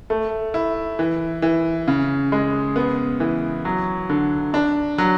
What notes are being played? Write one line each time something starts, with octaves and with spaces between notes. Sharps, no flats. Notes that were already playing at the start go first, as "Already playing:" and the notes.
A3
E4
E3
E3
C#3
G#3
B3
E3
F#3
D3
D4
F#3